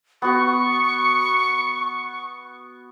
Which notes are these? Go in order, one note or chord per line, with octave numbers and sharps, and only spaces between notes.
B3 F#4 C#6